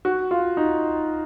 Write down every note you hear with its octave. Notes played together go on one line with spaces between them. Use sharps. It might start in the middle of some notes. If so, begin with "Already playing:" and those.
F#4
F4
D#4